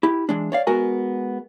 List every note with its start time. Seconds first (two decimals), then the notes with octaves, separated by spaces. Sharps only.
0.03 E4 G4
0.29 E3 G#3 D4
0.52 C#5 D5 F5
0.67 G#3 B3 F#4 A#4 G#5